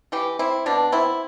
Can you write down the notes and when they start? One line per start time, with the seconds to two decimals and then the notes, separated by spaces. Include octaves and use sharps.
0.12 E3 G4
0.39 C4 E4
0.66 B2 D4
0.92 C4 E4